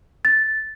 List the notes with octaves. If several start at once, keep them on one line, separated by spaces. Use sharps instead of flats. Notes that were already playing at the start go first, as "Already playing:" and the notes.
A6